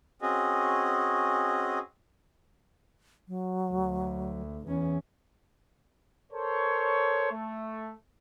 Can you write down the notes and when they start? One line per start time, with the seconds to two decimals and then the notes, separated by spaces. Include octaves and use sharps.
0.22 C4 C#4 F#4 G#4 D#5
3.28 F#3
3.70 D2
4.67 E2 C#4
6.31 A4 A#4 C5 C#5
7.31 A3